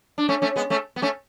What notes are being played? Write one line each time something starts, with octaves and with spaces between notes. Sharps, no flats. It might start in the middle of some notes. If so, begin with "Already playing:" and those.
D4
A3 C#4
A3 C#4
G#3 B3
A3 C#4
B3
A3 C#4